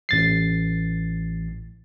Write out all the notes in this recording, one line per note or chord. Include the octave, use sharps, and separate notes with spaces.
A1 A6 C7